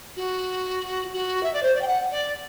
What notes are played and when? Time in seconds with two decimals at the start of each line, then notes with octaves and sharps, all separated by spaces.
0.16 F#4
1.13 F#4
1.43 E5
1.53 D5
1.62 C5
1.74 D5
1.81 G5
1.87 F#5
2.11 D5